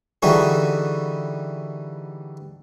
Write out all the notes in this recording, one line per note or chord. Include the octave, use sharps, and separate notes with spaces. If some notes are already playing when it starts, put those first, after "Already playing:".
D3 E3 G3 D#4 F#4 G#4